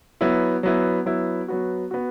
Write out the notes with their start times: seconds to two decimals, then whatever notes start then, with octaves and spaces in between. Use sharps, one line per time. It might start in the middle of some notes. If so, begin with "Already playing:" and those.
0.21 F#3 B3 E4
0.63 F#3 B3 E4
1.06 F#3 B3 E4
1.48 F#3 B3 F#4
1.91 B3 F#4